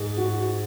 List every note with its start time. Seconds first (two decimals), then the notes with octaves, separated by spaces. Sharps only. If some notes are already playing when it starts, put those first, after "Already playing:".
Already playing: G#2
0.17 F#4